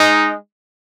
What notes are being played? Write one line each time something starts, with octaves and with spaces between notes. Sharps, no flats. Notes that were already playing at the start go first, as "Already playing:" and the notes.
Already playing: G#3 D#4